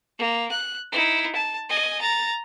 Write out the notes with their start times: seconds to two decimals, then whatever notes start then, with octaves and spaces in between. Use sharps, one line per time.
0.19 A#3
0.51 F#6
0.92 D#4 E4
1.35 A5
1.69 D#5 G#5
2.01 A#5 A6